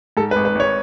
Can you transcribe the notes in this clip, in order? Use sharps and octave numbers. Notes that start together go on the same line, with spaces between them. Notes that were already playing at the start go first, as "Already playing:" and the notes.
G#2 A4
B4
G#1
B4
G#1 C#5